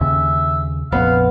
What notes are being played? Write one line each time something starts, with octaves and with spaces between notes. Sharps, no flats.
D#2 C#3 E5
A#1 F2 B3 F5